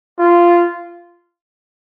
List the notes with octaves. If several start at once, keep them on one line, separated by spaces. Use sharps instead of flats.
F4